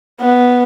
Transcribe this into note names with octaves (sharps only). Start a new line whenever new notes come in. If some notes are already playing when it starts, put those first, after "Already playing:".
B3